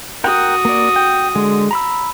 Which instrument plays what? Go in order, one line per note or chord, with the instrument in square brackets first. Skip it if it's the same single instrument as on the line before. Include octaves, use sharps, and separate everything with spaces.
[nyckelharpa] F#4 D#6 [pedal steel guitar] A#4 F#5 G5
[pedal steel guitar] A#3 D5
G5
D3 G#3
A#5 B5 E6